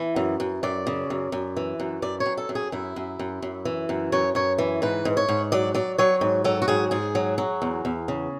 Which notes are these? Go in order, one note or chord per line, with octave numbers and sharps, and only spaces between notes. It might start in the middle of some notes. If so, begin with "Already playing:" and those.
Already playing: E3
F#2
F#2
F#2 D5
C#3
F#2
F#2
E3
F#2
F#2 D5
C#5
F#2
A4
F#2
G#4
F#2 E4
F#2
F#2
F#2
E3
F#2
F#2 C#5
F#2 C#5
E3
G#2 B4
G#2
C#5
G#2
F#3 D5
F#3 D5
F#3 C#5
G#2
F#3 A4
F#4
G#2 G#4
G#2 G#4
F#3
F#3
E2
E2
C#3